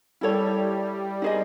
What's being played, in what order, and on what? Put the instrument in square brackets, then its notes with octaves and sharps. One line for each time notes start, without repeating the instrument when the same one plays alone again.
[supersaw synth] G3 [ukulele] E4 A4 C#5
[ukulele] D#4 G#4 C5 D#5